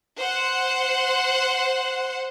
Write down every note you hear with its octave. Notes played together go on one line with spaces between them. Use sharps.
C5 F#5